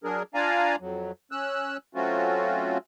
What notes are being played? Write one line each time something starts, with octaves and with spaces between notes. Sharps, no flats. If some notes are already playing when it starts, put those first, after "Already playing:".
F#3 D4 G#4 A#4
D4 F4 D5 F5 G#5 A#5
F2 F#3
C#4 E6 F#6
F#3 A3 C4 C#4 F4 F#4